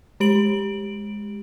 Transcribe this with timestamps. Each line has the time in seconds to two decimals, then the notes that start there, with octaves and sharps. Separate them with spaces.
0.20 G#3 G4 D7 F#7